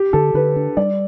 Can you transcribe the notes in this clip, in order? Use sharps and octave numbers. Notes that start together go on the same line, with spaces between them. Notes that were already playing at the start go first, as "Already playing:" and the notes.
Already playing: G4
D3 A4
D3 B4
D4
G3 D5